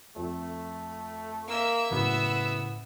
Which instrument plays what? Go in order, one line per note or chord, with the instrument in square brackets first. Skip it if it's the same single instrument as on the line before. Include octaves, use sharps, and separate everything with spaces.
[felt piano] F2 [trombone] A3
[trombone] A#3 [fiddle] E5 E6
[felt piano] F#1 F#2 A2 [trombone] B3